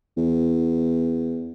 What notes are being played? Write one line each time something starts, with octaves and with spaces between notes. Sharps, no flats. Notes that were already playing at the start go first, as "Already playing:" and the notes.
E2